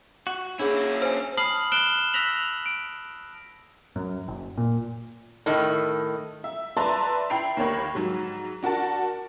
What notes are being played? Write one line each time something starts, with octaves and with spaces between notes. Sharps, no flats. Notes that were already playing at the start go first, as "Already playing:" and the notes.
F#4
A#3 C#4 D4 E4 G#4
C5 G#5
A5 B5 D#6 F6 C7 F#7
F6 F#6 D7 E7 G7
E6 F#6 A#6 B6 F7 F#7
D7
F#2
F#1
A#2
A2 D#3
E5
B4 D5 E5 A5 A#5 C6
E4 G5 B5 C7 F7
D#2 A#3 G4 C#5 B5
G#2 F#3
D4 F#4 A#4 A5